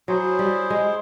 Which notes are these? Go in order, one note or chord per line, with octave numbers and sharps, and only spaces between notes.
F#3 E4 G#4 C5
G3
G#3